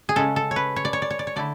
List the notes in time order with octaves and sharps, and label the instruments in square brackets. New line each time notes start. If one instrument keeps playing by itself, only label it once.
[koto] G#4
C#3 G#3 C#4 A4
A4
C#5
B4
C#5
D5
C#5
D5
C#5
D5
C#5
D3 A3 E4 D5